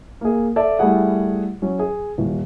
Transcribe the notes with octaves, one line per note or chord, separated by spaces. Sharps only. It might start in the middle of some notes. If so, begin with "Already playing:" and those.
A#3 G#4
A4 D5 E5
G3 A3 E4 G#4 F#5
F#3 C#4
G#4
D#1